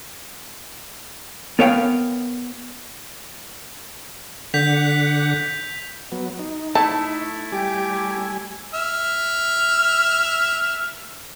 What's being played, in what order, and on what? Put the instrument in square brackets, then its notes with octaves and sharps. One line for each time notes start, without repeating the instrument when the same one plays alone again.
[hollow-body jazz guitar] B3 A#4 C#5 F5 G5
[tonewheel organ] D3 F#5 [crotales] G6 B6 F7
[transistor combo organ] F#3 B3
D#4
[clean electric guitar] A3 E4 [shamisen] A5
[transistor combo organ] G3 G#5 [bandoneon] G4 D6
[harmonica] E5 F6